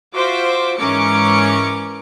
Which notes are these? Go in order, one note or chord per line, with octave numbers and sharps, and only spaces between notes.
F4 F#4 C5 E5 D6
G#2 E3 C#4 A#4 D6 C#7